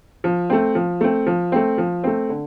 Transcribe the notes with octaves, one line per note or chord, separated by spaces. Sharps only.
F3
A3 C4
F3
A3 C4
F3
A3 C4
F3
A3 C4
D3